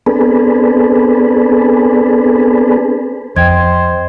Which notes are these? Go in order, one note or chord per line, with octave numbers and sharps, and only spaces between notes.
B3 C4 D4 G#4 A4 B4
F2 C5 D#5 G5 G#6